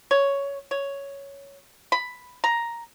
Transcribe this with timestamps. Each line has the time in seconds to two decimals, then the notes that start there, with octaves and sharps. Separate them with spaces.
0.11 C#5
0.71 C#5
1.92 B5
2.44 A#5